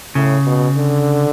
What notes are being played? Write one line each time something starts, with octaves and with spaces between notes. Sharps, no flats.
A2 C#3
B2
D3